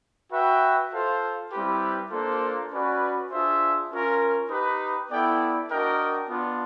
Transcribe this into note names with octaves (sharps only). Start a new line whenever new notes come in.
F#4 B4 E5 G5
F4 A4 C5 F5
G3 C4 E4 G4 B4
A#3 D4 F4 A4 C5
C#4 F#4 B4 D5
D4 F4 G#4 C5 E5
C#4 F4 A#4
D#4 G4 B4
B3 E4 A4 D5 G5
D4 F#4 A#4 D#5 G5
B3 D4 F4